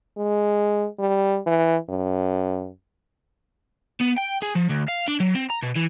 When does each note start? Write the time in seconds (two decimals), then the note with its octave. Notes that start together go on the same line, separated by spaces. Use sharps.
0.18 G#3
0.99 G3
1.47 E3
1.89 F#2
4.01 B3
4.18 G5
4.43 G#4
4.56 F3
4.70 D2
4.89 F5
5.08 D4
5.20 F#3
5.35 C4
5.50 A#5
5.63 B2
5.76 E3